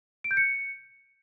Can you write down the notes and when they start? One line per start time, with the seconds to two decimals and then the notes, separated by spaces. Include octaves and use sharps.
0.24 D7
0.31 G6
0.37 C#7